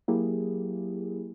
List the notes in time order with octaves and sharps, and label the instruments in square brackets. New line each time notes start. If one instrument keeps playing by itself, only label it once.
[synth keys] F#3 A#3 E4 G4 G#4